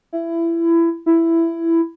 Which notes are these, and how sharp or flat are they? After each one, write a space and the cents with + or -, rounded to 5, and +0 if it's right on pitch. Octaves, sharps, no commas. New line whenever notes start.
E4 +20
E4 +10